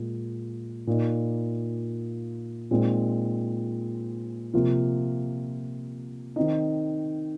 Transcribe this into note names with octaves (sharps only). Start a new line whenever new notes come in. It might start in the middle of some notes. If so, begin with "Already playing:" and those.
Already playing: A#2 G#3
A#2 A#3 D#4
A#2 G#3 C4 D#4
C3 F3 A#3 F4
D#3 C4 D#4